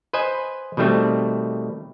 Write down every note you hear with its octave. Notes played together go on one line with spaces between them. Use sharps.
B4 C5 D#5 G#5
B2 D#3 G3 A3 C4